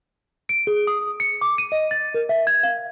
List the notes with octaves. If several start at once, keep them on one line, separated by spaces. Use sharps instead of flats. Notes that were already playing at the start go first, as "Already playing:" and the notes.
D7
G#4
D#6
C#7
D6
D#7
D#5
A6
A#4
E5
G#6
F5